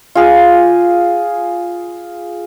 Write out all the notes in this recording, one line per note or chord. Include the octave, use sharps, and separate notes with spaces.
F4 G#4